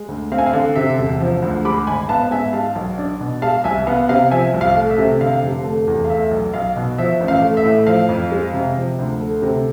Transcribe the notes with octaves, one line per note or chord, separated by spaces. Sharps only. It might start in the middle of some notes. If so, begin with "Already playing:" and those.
Already playing: G#3
D2
C4 F5
G#5
F5
D3
C3 E5
E1
F3
D2
G#3 B5 D6
G#1 G#5 B5
B3 F5 A5
G#2 E5 G#5
G#3 F5 A5
B1
D4
B2
G#3 F5 A5
C2 E5 G#5
B3 F5
C3 F5
F3 E5 G#5
C2
F5
A3
E5
C3
D3 F5
F1
A3
E2
F5
A3 E5
B1
B1 F5
B2
F3 E5
A1
F5
A3
E5
A2
F3 F5
F2
G#3
C3
F3
D2
A3
C3